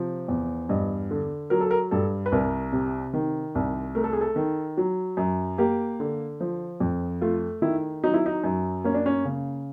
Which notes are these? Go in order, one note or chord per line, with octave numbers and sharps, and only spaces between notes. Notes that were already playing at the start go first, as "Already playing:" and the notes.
Already playing: C3 F3
E2
G2 D#5
D3
F#3 A#4
A4
A#4
G2 A4
B4
C2 A#4
C3
D#3
C2
A3 A#4
A4
G#4
A4
D#3
F#3
F#2
A#3 G4
D3
F3
F2
A3 F4
D#3 E4
F#3 D#4
E4
D#4
F#2
A#3 C#4
D4
C#4
C#3